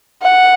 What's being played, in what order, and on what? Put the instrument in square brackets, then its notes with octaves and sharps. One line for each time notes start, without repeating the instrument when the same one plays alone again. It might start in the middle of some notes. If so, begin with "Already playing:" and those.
[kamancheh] F#5